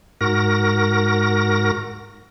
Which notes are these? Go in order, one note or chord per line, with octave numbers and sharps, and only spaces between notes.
G#2 F#4 A#4 A#6